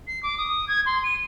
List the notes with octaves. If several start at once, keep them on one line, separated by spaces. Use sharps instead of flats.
C7
D6
D#6
G#6
C6
D#7